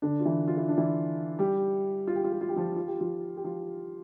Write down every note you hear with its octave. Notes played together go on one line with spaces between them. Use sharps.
D3 D4
F4
E3 E4
F4
E4
D4
E3 E4
G3 G4
F4
G4
F4
G4
F4
G4
F3 F4
F4
G4
F3 F4
G4
F3 F4